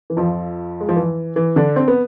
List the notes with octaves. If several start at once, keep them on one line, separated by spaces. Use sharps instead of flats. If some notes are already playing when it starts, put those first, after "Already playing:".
E3
F2 F3
G#3
F3
E3
E3
D3 D4
C4
B3